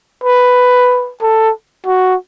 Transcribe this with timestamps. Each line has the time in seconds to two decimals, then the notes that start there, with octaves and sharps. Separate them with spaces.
0.24 B4
1.22 A4
1.86 F#4